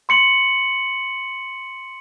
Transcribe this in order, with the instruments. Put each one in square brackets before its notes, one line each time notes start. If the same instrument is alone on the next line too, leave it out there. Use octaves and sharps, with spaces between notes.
[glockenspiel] C6 C#7 F#7